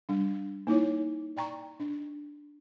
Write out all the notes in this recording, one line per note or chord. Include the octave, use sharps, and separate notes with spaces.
G3 D4
A#3 D#4 E4 C#5
D5 G5 A#5 C#6
D4